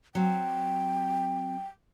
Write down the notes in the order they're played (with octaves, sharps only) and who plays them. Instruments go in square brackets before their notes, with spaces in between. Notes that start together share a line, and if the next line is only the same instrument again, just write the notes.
[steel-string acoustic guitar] F#3 C4 [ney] G5